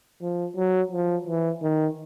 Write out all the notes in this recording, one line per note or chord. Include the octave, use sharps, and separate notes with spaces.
F3
F#3
F3
E3
D#3